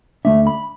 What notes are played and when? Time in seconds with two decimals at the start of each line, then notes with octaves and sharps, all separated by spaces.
0.25 D2 D3 A3 D4 E5
0.47 B5